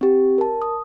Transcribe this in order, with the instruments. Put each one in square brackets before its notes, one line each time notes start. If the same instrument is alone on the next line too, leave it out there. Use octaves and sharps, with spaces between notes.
[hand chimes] C4 G4
A#4 A5
D#6